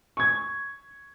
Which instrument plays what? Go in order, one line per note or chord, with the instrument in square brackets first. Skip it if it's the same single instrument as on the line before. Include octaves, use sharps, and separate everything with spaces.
[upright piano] C#6 G#6